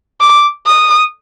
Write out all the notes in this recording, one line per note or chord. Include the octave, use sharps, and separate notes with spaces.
D6
D#6